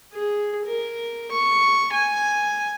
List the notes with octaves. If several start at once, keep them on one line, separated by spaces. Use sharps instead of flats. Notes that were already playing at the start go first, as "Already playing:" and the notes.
G#4
A#4
C#6
G#5